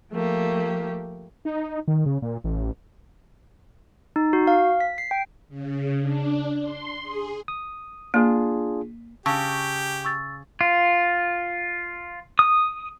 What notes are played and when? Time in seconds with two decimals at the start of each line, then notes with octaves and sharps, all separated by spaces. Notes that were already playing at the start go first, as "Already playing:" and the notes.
0.11 F3 A3 A#3 G4
1.45 D#4
1.88 D#3
2.06 C#3
2.22 A#2
2.44 A1
4.16 D#4
4.33 F#4
4.47 F5
4.80 B6
4.98 C7
5.11 G5
5.49 C#3
6.01 D4
6.61 C6
7.02 G#4
7.48 D#6
8.14 A#3 D4 F4 G#4
9.26 C#3 G4 A5 C#6 E6
10.05 C#6 E6 A6
10.61 F4
12.39 D#6